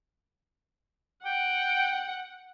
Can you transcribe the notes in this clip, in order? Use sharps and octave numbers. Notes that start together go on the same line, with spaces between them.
F#5 G5